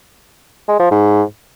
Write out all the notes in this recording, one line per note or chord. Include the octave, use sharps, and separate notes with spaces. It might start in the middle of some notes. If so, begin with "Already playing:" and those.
G#3
F3
G#2